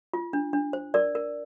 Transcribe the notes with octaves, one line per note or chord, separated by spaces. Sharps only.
F4
D4
D4
C5
A#4 D5
A#4